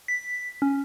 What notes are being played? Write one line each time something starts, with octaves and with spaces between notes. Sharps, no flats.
B6
C#4